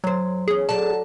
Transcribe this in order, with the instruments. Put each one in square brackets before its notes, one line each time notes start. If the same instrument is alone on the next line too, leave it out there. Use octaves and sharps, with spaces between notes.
[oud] F#2 C5 [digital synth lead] F#3
[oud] E2 C#4 [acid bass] G#4
[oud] F#3 A4 D5 [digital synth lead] A5